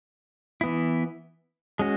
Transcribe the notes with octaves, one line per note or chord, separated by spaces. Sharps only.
E3 B3 E4
G#3 C#4 F#4